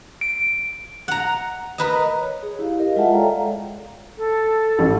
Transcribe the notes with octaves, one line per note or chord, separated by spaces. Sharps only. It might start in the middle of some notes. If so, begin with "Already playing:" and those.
D7
F#5 A#5
A#4 B4 D#5
C#5
G#4
E4 G4 F5
A#4 D#5
G#3 F4 G#4 E5 F#5 A5
A4 C#5 D5 F5 G5 A#5
A4
A1